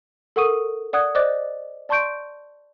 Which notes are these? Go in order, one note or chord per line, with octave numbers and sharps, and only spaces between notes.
A4 A#4 F#5 C#6 D#6 D#7
D5 F#5 D#6 F#6 G#6
C5 D5 D#5 D6 F#6 A6
D5 A5 C6 C#6 G6 D7